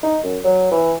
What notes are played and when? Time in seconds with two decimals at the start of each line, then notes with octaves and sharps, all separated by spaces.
0.03 D#4
0.24 F#2
0.44 F#3
0.71 E3